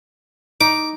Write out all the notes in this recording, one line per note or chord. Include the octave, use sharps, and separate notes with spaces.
D#4 D6